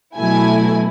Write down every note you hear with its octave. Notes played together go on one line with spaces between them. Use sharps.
B2 F#3 A3 E4 G#5